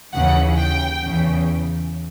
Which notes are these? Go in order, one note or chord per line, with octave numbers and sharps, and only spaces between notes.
D#2 C#3 E3 F#5
G5
E2 C#3 E3